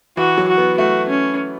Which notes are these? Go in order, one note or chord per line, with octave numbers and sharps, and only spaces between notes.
E3 F#4
F#3
F#4
B3
A3 F#4
C#4